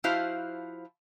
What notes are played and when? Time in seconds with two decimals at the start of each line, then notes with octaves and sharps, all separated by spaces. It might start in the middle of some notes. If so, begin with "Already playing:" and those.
0.04 F3 E4 F#4 C5 F5 A5